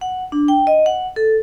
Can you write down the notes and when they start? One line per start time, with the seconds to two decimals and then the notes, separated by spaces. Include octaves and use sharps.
0.01 F#5
0.32 D4
0.48 G5
0.67 D#5
0.86 F#5
1.16 A4